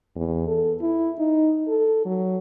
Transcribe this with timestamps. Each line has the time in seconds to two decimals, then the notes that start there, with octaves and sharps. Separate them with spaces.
0.16 E2
0.48 A4
0.81 E4
1.19 D#4
1.68 A4
2.05 F#3